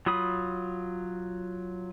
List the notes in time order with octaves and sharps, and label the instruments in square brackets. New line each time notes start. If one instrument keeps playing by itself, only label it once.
[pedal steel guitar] F#3 F4 B5 D#6